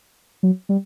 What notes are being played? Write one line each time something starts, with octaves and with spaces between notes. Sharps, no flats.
F#3
G3